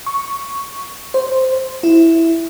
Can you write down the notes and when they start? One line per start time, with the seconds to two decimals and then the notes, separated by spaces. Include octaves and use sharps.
0.06 C#6
1.14 C5
1.83 E4